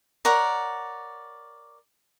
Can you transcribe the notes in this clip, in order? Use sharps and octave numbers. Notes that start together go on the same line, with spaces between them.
A#4 C#5 D5 F#5